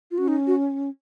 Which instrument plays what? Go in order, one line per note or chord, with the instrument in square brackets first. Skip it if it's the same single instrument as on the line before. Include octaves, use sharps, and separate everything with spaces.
[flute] F4
[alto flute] C#4 [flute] F#4
[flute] D#4
F#4